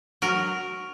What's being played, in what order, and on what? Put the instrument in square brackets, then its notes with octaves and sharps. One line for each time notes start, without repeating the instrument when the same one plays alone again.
[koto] F#3 A#4